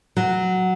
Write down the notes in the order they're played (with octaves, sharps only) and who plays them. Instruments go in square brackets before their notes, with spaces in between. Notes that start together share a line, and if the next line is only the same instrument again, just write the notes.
[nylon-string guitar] F#3